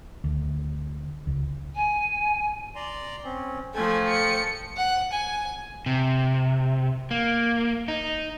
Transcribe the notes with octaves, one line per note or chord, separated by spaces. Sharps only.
D2
C#2
G#5
D5 A#5 C6
C4 C#4
F3 A3 A4 G5 G#5
C#7
F#5
G#5
C3
A#3
D#4